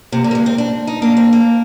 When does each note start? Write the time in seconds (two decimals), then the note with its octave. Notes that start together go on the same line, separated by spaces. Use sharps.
0.12 C3 A#3
0.24 D3
0.31 A#3
0.35 G#3
0.46 C4
0.58 D4
0.87 D#4
1.02 A#3 D4
1.17 C4
1.33 A#3